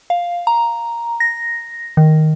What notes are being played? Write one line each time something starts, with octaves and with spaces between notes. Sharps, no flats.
F5
A#5
A#6
D#3